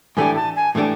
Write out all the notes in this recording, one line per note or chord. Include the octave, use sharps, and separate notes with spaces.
A2 E3 A3 D4 G4 G#5
A5
G#5
A2 E3 A3 D4 G4